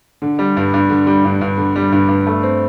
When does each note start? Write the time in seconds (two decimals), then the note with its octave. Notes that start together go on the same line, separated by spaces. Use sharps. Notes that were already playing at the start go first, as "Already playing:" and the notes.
0.22 D3
0.39 G3
0.57 G2
0.74 G2
0.90 D3
1.07 G3
1.24 G2
1.41 G2
1.57 D3
1.76 G3
1.92 G2
2.09 G2
2.27 A3
2.43 C4